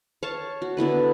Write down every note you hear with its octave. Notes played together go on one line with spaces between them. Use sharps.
C#5 F5 A5 C#6
F#4
D3 B3 E4 B4